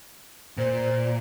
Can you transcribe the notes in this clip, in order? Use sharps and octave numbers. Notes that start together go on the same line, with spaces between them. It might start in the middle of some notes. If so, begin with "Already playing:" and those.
A#2 C5